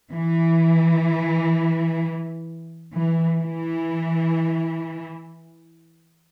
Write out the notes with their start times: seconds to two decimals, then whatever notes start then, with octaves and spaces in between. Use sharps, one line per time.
0.13 E3
2.94 E3
3.40 E3